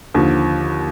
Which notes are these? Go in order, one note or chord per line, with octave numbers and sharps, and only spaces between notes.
D#2 D3 F3